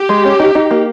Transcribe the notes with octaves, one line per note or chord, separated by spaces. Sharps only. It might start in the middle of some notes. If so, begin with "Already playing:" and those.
Already playing: G4
G#3
C#4
D#4
D#4
A#3